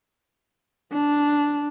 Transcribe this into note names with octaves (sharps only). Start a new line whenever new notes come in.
D4